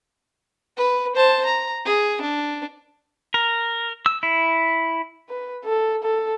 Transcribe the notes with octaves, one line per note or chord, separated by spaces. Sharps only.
B4
C5 A5
A#5
G#4
D4
A#4
E6
E4
B4
A4
A4